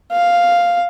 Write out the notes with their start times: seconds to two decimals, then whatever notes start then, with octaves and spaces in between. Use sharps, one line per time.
0.12 F5